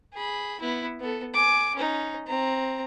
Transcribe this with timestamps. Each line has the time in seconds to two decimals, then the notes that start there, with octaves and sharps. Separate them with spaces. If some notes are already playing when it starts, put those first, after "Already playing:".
0.14 G#4 B5
0.60 B3 E4
1.00 B3 A4
1.34 G#5 D6
1.75 C#4 D#4
2.27 C4 A#5